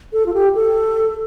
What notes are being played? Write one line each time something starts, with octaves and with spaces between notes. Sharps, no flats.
A4
F4
G4
A4